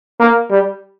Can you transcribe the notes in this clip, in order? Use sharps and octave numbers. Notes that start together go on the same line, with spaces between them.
A#3
G3